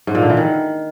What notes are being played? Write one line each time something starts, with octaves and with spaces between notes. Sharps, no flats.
G#2
A#2
D3
E3
D#3